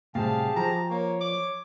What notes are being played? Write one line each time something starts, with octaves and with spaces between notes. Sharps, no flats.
A2 C3 G3 G4 G#4 F5 A5
F3 A#5
A#3 C#5
D6